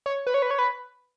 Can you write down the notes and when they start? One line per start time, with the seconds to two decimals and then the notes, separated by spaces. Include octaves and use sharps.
0.06 C#5
0.27 B4
0.34 C#5
0.42 B4
0.51 C#5
0.58 B4